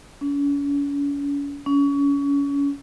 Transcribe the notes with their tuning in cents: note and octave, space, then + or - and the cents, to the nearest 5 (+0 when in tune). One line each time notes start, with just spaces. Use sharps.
C#4 +40
C#4 +30